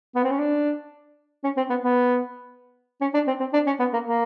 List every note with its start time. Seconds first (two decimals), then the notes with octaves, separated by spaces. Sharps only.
0.15 B3
0.24 C4
0.30 C#4
0.39 D4
1.44 C#4
1.57 C4
1.70 B3
1.83 B3
3.01 C#4
3.14 D4
3.27 C4
3.40 C4
3.53 D4
3.67 C#4
3.79 B3
3.93 A#3
4.06 A#3